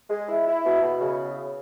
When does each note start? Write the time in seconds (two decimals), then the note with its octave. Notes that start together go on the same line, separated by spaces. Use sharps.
0.10 G#3
0.28 E4
0.46 E4
0.65 B2
0.82 B2
1.00 C#3